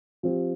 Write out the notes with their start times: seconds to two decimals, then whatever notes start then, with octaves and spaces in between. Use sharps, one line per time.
0.23 F3 C4 G4